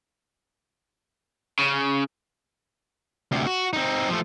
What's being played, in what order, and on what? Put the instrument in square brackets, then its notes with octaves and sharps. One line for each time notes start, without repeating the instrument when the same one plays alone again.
[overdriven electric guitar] C#3
[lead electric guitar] D2 C3
F#4
C4 D#4
F3 A3